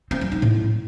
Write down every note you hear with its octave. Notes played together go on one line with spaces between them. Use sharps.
C4
G3
D#4
A2